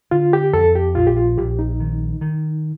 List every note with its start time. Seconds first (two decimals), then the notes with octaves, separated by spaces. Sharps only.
0.11 D3 F4
0.33 G4
0.53 F2 A4
0.75 G4
0.95 A#1 F4
1.07 G4
1.16 F4
1.38 A#1 G4
1.59 D#4
1.80 D#3
2.21 D#3